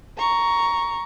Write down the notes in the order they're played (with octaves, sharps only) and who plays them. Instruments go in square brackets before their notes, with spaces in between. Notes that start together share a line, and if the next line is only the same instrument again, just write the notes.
[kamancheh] A#5 C#6